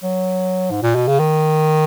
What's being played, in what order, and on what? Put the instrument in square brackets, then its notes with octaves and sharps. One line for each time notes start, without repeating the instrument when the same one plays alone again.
[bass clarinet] F#3
G#2
A#2
B2
C#3
D#3